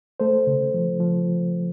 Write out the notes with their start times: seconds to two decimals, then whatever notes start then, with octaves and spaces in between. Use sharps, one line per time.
0.20 A3 A4 C5
0.47 C#3
0.74 F3
1.00 F3